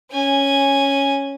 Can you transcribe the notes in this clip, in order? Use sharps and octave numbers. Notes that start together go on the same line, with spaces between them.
C#4 G#5